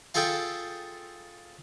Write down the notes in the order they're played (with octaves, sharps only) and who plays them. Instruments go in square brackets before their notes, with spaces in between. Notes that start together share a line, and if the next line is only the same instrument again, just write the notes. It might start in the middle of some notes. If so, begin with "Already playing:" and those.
[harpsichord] F4 G#4 A4 E5 G5